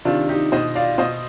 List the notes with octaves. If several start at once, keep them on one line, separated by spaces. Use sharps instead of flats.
C3 D#3 D4 F4
D#4 G4
B2 C5 D#5
D5 F5
B2 C5 D#5